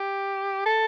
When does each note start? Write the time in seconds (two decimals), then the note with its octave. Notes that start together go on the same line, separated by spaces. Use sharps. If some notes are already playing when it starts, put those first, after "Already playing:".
Already playing: G4
0.66 A4